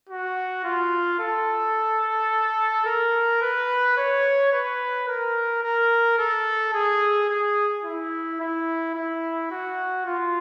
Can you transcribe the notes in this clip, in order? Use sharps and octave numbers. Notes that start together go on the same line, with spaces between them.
F#4
F4
A4
A#4
B4
C#5
B4
A#4
A#4
A4
G#4
G#4
E4
E4
E4
F#4
F4